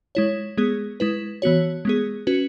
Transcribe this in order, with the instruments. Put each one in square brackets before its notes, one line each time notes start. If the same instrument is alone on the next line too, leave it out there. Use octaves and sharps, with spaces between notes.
[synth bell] G#3 E4 C#5
G#3 B3 G#4
G#3 E4 B4
E3 B3 F#4 C#5
G#3 B3 G#4
C#4 F#4 B4